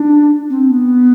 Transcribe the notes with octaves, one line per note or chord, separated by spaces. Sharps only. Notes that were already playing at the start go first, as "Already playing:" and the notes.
Already playing: D4
C4
B3